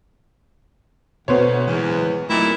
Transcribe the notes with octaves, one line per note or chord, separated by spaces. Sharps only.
D2 B2 B3 C5 C#5
E2 C#3 E3 G#3
A#2 D#3 F#3 A3 E4